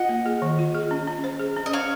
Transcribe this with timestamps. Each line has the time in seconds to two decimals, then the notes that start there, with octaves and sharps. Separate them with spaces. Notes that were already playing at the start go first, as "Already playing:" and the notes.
Already playing: F4 D#5 F#5
0.09 A#3
0.26 G#4
0.42 D#3
0.59 F4
0.75 G#4
0.91 C#4
1.07 C#4
1.24 C5
1.39 G#4
1.56 C#4
1.66 D#5
1.73 C#4 C#5 F5